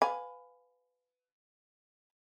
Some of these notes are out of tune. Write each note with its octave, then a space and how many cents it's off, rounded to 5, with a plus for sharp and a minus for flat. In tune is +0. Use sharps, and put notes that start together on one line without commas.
B4 +20 F5 +25 G#5 +0